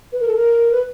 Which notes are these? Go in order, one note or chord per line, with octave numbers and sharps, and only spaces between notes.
B4
A#4
A4
A#4
B4